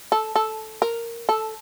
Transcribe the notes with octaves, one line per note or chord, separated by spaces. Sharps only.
A4
A4
A#4
A4